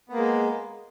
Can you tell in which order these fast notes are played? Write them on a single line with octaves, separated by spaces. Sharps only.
B3 A#3 G#3